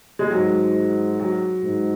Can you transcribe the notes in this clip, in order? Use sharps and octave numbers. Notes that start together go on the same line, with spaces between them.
G#3
G#2 F#3
F#3
G#2